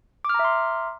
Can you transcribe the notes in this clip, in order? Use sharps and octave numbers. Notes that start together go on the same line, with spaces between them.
E5 A#5 C6 D6 F6